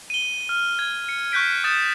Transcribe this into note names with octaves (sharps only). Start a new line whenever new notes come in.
D#7 G7
F6
G#6
C#7
C#6 F#6 G6 B6 D7
D#6 G6 A6 E7